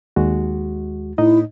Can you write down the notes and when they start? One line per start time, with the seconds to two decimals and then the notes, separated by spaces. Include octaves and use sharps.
0.16 D#2 G#3 F#4
1.18 A2 D#4 E4 D#5